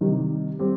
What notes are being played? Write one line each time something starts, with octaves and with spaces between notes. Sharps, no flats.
C3 D#3 G3
G3 C4 G4